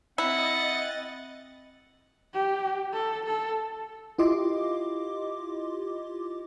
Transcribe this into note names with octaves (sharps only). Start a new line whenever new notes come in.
C4 E4 D#5 F#5 A6
G4
A4
A4
E4 F4 G4 D#5 C6 D6